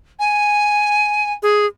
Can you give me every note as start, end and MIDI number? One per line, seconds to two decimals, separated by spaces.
0.19 1.33 80
1.43 1.66 68